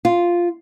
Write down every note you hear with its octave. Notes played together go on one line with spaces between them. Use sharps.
F4